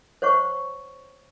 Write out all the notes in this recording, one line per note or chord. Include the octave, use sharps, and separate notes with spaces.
C5 C#5 F#5 C#6